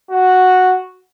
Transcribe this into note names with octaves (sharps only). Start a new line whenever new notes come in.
F#4